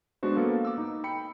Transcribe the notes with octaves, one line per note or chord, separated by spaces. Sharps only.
G#3 B3 D4 F#4 C5
A#3 B3 A4 F5
D6 E6
D#4
G5 B5 C#7